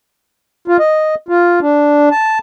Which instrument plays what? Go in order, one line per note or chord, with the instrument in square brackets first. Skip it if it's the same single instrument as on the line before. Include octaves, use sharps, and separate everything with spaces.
[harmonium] F4
D#5
F4
D4
A5